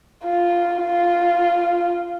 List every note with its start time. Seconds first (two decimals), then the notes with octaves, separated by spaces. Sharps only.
0.24 F4
0.83 F4